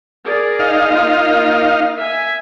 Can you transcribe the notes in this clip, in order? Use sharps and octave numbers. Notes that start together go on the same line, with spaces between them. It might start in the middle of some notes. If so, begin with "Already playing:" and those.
G#4 A#4 D5
D#4 F5
A#3 F4 A#4
E5 G#5